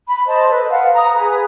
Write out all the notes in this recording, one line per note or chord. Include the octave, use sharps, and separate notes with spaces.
B5
C5 D#5 A5
A4 B4
F5 F#5
A#5 D#6
G#4 B4